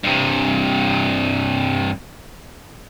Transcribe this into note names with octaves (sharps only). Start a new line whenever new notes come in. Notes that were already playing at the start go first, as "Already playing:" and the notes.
G2 C3